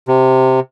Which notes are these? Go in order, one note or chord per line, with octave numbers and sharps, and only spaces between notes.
C3